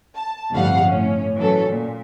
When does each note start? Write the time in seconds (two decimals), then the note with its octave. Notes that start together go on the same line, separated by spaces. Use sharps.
0.16 A5
0.52 G1 F2 A2 G3 F5 F#5
0.87 A2 C#4
1.38 E3 F#3 C#4 A4
1.70 A#2